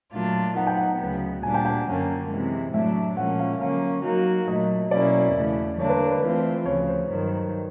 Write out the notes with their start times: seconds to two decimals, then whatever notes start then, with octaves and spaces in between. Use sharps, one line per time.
0.12 A#2 F#3 A3 D4 F4
0.55 F#3 B3 D#4 F#5
0.67 G5
0.77 F#5
0.99 D2 C#3 F#3 B3
1.43 A#2 G3 A#3 D4 G#5
1.54 G5
1.65 G5
1.86 F#2 D3 F#3 A#3 C#4
2.30 C3 E3 G#3
2.73 A2 F#3 A3 D4 E5
3.17 A#2 F3 G#3 C#4 F#5
3.39 F5
3.60 D3 F#3 A#3 C#4 F5
4.04 F#3 A#3 D#4 F#4
4.47 A#2 F#3 A3 D#5
4.91 B2 F#3 A#3 C#4 E4 D5
5.34 E2 C#3 E3 A3
5.79 D3 G3 A#3 D4 C#5
5.89 B4
6.11 B4
6.22 E3 A3 C4 F4
6.66 D2 C#3 F3 C#5
6.88 C5
7.09 G2 D#3 F#3